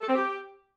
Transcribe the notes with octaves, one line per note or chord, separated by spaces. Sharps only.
A4
C4
G4